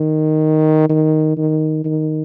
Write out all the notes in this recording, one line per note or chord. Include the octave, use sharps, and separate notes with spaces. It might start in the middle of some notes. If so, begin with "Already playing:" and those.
Already playing: D#3
D#3
D#3
D#3